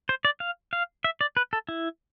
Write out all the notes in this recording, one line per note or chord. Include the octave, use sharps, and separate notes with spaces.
C5
D5
F5
F5
E5
D5
B4
A4
E4